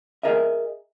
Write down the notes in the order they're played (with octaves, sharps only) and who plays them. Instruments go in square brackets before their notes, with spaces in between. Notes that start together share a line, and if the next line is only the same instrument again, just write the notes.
[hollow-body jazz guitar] G#4 A#4 D#5 E5